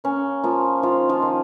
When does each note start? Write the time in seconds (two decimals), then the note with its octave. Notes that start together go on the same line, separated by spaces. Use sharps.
0.04 A#3 C#4
0.44 F3 A#3 F4
0.82 D#3 F3 F4
1.09 F3 F4
1.22 D#3